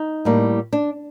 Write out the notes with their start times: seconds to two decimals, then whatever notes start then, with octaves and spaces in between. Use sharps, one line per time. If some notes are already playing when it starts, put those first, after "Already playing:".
Already playing: D#4
0.25 A2 G3 A#3
0.73 D4